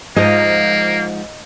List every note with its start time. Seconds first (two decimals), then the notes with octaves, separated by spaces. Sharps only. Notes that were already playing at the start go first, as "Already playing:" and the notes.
0.16 G#2 F3 A#3 D#5